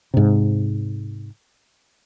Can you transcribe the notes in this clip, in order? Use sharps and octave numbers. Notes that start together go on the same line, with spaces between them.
G#2 C3